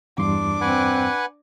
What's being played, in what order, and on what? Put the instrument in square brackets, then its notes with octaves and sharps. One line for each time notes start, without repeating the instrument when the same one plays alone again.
[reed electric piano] E2 G2 C6 [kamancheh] D4 D6
[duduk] C4 [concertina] B4 F#5 G#5